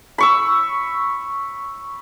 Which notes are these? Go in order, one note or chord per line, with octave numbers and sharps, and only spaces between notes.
B5 C#6 E6